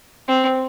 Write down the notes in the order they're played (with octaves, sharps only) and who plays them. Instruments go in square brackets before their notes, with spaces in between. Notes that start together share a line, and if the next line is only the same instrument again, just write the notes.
[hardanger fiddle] C4